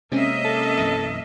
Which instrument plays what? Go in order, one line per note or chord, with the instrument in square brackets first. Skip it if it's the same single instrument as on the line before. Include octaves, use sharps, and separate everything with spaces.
[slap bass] C3 G#3 [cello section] A#3 D#5 E5 [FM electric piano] C4 C#4
[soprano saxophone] A4
[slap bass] B1 F#2 E3